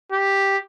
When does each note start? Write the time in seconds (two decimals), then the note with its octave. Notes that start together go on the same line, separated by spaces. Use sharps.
0.12 G4